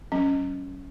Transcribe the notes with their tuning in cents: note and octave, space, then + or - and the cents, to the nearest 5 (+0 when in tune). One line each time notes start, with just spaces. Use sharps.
F#3 +40 C#4 +0